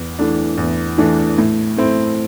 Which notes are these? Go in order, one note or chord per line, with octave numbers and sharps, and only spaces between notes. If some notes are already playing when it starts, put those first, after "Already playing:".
Already playing: E2
E3 A3 D4
E2
E3 A3 D4
A2
A3 C4 E4